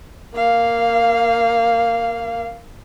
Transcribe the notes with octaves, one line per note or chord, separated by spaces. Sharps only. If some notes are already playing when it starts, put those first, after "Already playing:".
A#3 F5